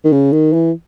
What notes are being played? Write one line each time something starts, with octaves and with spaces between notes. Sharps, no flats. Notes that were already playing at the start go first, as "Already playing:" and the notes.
D#3
C#3
D#3
E3